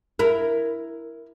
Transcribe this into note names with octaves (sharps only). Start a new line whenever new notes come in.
E4 A#4